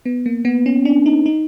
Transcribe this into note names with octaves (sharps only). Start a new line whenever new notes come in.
B3
A#3
B3
C#4
D4
D#4
D#4